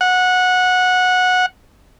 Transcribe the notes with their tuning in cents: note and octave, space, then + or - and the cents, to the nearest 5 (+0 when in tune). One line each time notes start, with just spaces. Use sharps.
F#5 -15